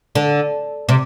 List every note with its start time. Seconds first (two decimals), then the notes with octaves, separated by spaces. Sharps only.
0.15 D3
0.89 C3